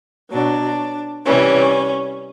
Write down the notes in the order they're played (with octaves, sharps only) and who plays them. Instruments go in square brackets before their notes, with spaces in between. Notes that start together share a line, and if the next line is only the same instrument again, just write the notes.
[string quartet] B2 F#3 D4
C3 E3 G3 C#4